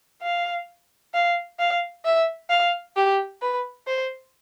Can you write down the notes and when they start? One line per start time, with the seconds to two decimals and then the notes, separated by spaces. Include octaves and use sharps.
0.22 F5
1.14 F5
1.59 F5
2.05 E5
2.50 F5
2.96 G4
3.42 B4
3.87 C5